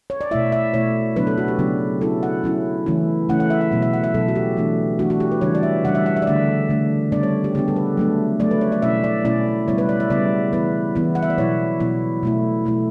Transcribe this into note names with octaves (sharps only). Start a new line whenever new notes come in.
C#5
D5
B2 A3 E4 E5
E5
B2 A3 E4 C#5
C#3 F#3 B3 D4 B4
A4
F#4
G4
C#3 F#3 B3 D4
F#3 C#4 E4 A4
F#5
F#3 C#4 E4
C#3 E3 A3 C#4 E4
C#3 E3 A3 C#4 E4 F#5
F#5
E5
F#5
B2 F#3 B3
E5
F#5
E5
B2 F#3 B3 A4
F#4
G4
E3 A3 D4
E3 A3 D4 F#4
F#4
G4
B4
C#3 E3 G3 D4 C#5
D5
E5
C#3 E3 G3 D4 F#5
E5
F#5
E5
D5
D3 A3 D4 E5
D3 A3 D4
C#3 G3 B3 D4 D5
C#5
G4
C#3 G3 B3 D4 G4
A4
B4
F#3 A3 D4
F#3 A3 D4 D5
B4
C#5
D5
B2 A3 C#4 E4 E5
D5
B2 A3 C#4 E4 D5
C#3 G3 B3 E4 C#5
B4
D5
E5
C#3 G3 B3 E4 D5
E3 B3 E4 B4
E3 B3 E4
F#5
E5
D5
B2 F#3 B3 E4 C#5
B2 F#3 B3 E4
B2 A3 E4
B2 A3 E4